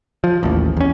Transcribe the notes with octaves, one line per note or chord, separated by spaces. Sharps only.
F3
A1 D#2
E2 C#4